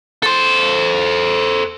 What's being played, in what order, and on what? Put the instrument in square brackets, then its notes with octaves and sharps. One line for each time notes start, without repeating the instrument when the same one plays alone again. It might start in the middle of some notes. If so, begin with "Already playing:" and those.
[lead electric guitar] A4 C5